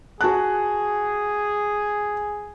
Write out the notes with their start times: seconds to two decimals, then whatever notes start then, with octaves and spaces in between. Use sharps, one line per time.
0.21 F#4 G#4 A5 F#6